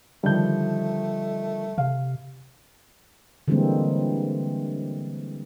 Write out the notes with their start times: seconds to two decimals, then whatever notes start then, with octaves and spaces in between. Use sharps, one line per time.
0.24 D3 D#3 F3 G3 A3 G6
1.78 C3 F5
3.48 D3 E3 G3 G#3 A#3 C4